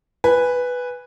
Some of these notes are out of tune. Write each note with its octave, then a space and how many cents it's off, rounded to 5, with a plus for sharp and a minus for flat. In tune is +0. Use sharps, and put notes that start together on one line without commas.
B4 +0 G#5 -15